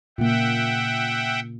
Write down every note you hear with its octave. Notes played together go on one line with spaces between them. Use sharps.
A#2 C#3 A#3 E5 F#5 G5